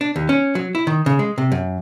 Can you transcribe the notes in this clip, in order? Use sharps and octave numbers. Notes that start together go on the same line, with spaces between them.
D4
D#2
C#4
F#3
E4
D#3
C#3
G#3
C3
F#2